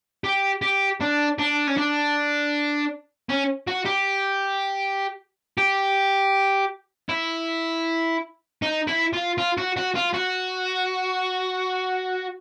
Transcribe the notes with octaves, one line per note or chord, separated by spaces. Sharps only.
G4
G4
D4
D4
C#4
D4
C#4
F#4
G4
G4
E4
D#4
E4
F4
F4
F#4
F#4
F4
F#4